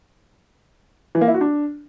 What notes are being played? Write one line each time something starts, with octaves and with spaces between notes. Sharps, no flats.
E3
A#3
E4
F#4
D4